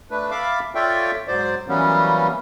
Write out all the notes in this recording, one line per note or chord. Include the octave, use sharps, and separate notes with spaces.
A3 D4 B4
E5 F5 A5 B5 D6
F4 A4 C#5 D5 E5 G5
G#2 F#3 C5 D5
E3 F#3 G3 A#3 B3 C#4